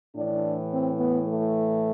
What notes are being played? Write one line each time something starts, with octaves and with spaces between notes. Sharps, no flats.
A2 E3 D4
C4
B3
A3